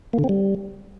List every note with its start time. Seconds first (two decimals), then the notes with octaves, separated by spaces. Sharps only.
0.13 A#3
0.19 D3
0.24 C4
0.29 G3